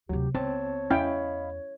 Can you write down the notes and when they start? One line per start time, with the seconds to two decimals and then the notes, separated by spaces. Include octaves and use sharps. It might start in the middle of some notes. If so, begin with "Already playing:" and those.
0.09 D2 C3 F#3 G4
0.34 C#2 B3 C4 C#5 A5
0.90 E2 C#4 E4 D#5 F5 G5 B5